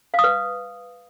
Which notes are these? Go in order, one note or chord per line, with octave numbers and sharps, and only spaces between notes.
F5
D#6
B4